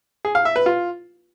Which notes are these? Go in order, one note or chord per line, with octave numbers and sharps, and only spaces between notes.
G#4
F5
E5
B4
F4